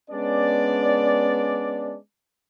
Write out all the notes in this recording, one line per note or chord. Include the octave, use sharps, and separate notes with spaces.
G#3 B3 C#4 D4 D5